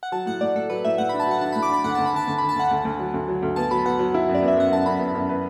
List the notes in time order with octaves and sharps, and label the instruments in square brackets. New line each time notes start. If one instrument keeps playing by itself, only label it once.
[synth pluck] F#5
[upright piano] F#3 [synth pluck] A5
[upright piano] A2 [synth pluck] F#5
[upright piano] A2 [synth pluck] D5
[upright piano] A2 [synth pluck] A4
[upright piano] F#3 [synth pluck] B4
[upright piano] A2 [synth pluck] E5
[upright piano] A2 [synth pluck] F#5
[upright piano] D4 [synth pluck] B5
[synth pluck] A5
[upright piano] F#3 [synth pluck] F#5
[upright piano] D4 [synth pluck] A5
[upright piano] A2 [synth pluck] B5
[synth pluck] D6
[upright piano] D4 [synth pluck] B5
[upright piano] D2 [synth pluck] F#5
[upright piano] D2 [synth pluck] A5
[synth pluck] B5
[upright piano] D3 [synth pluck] A5
[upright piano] D2
[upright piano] D3 [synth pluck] B5
[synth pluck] A5
[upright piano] D2 [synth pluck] F#5
[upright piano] D2
D2
F#3
D2
F#3
D2
[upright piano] B3 [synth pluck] A5
[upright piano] F#3 [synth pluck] B5
[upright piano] B3 [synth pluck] F#5
[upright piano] F#3
E4
F#2
[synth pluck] D5
[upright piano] B3
[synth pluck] E5
[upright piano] F#2 [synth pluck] F#5
[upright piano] F#2 [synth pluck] A5
[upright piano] F#2 [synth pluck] B5
[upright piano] B3
F#2
B4